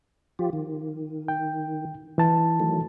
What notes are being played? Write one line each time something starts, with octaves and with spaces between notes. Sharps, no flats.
F3 F4 G4
D#3
G5
E3 A5
D#3 F#3 A3